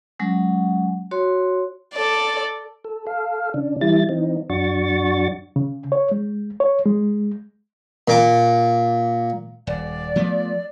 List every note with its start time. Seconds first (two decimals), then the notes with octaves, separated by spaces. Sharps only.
0.19 F#3 G#3 C#4 F#5
1.11 F#4 C#5 C6
1.94 A4 D5
2.84 A4
3.07 A4 F5
3.54 C#3 D4
3.81 E3 G3 E4 A6
4.09 E3 C4 D#4
4.50 F#2 D4 F#4 C#6 A6
5.56 C#3
5.92 C#5
6.11 G#3
6.60 C#5
6.86 G#3
8.08 A#2 D6
9.67 D#1 D5
10.16 F3 A3 B3